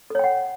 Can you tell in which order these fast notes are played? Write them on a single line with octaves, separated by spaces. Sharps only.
A4 C#5 G5 F#5